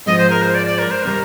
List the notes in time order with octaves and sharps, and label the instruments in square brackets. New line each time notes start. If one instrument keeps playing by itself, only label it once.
[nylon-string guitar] G#2 F3 G#3 C4 [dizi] D#5
[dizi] C5
A#4
C5
D5
D5
A#4
C5
[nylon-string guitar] C3 D#3 G3 [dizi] A#4